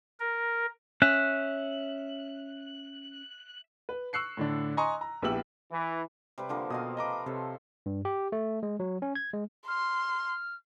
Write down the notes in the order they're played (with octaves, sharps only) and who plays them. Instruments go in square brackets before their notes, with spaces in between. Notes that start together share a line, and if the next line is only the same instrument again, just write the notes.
[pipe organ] A#4
[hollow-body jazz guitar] C#4 [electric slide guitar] E5 [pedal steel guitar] F#6
[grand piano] B4
C#6 E6 F#6 C7 C#7
A2 D3 D4
D#5 G#5 A#5 C6 C#6 D#6
A#5
A#1 B3 E4 G4 E6 F#7
[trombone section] E3
[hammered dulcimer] C3 G3 B4
D3 F3 A#3
[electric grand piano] B2 D#6 [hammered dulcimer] C4 D#5 F5
[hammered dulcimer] C3 B4 B5 [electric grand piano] D#5 A#5 D6
[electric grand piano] C3 [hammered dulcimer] A4 C5 C#5
[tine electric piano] G2
G4
A3
G#3
F#3
C#4
G#6
G#3
[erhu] C6 [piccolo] F6